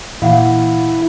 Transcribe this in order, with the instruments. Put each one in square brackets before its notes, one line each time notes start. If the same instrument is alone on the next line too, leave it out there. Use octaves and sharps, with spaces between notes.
[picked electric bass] A#2 E3 [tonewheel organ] E4 [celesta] F5 F#5